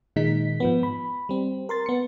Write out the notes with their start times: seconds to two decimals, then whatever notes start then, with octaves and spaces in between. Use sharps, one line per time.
0.16 A#2 D#3 G#3 D#4 B6
0.60 G#2 F3 B3
0.83 B5
1.29 G3 C4
1.69 A#4 C6 A6
1.86 B3 C#7